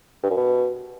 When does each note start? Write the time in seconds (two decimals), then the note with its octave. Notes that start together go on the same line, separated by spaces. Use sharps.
0.23 G2
0.30 F#2
0.37 B2